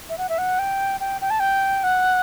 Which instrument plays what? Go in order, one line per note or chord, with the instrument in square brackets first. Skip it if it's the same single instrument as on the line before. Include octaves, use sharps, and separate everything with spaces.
[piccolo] E5
F#5
E5
F#5
G5
G5
G5
A5
G5
F#5